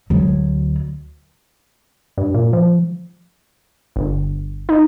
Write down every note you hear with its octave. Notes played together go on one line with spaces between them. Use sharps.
D2 F#3
G2
A#2
F3
G1
D#4